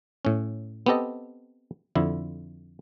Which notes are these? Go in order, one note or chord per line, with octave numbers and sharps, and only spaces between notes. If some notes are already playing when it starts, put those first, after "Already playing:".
A2 C#4
B3 C4 G4 A4 D#5
F2 D3 E4